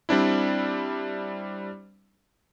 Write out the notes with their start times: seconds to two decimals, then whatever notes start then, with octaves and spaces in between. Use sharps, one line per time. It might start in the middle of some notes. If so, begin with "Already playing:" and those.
0.09 G3 C4 D4 E4